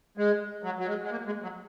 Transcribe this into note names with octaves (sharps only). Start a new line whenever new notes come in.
G#3
F#3
F#3
G#3
G#3
A#3
G#3
F#3